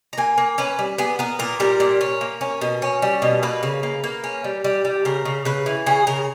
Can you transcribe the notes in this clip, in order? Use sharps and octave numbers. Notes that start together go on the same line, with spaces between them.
A#5
A#3 G#5
A#3
C#4 B4
G3
B3 G#4
B3 A#4
A#2 A#4
G3 A#4
A#2
C#4
A#3
C#4
B2
C#4
G3
B2
A#3 B4
C#3
A#3
A#3
C#4
G3
G3
G3
C#3 A#4
C#3
C#3 B4
E3
C#3 G#4
C#3 A#4